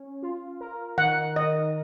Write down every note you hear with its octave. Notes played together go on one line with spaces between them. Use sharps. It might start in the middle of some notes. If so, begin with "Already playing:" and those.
Already playing: C#4
F4
A#4
D#3 F#5
D#3 D#5